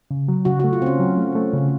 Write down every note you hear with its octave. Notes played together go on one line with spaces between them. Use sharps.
C#3
F#3
C#3 F#4
F#4
A3
F4
C#3 C4
C#4
F#3
A3
A3
C#3